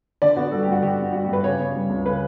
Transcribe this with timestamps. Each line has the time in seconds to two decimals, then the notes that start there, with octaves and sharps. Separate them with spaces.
0.22 D3 D5
0.36 B3 F#4
0.51 G3 A4
0.63 G4
0.68 G2 F#4
0.82 D3 G4
0.98 B3
1.13 G3 F#4
1.24 G4
1.28 G2
1.33 B4
1.43 C#3 C#5
1.58 B3
1.74 G3
1.89 C#2
2.04 C#3 B4